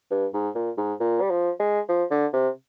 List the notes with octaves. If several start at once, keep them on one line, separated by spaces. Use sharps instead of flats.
G2
G#2
A#2
G#2
A#2
G3
F3
G#3
F3
D3
C3